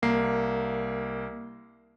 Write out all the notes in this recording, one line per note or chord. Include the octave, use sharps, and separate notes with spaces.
C2 A#3 C7